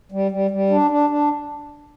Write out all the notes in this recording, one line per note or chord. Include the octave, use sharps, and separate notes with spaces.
G3
G3
G3
D4
D4
D4